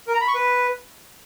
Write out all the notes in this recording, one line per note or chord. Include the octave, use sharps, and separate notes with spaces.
A#4
A#5
B5
C#6
B4